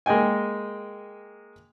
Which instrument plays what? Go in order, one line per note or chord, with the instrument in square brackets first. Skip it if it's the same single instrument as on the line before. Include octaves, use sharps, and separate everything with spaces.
[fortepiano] G#3 A#3 D#5 G5 G#5